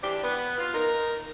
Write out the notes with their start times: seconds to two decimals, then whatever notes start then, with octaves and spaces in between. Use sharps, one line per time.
0.03 E3 D4 G4 C5 D5
0.23 B3 B4
0.58 F4
0.74 D#4 A#4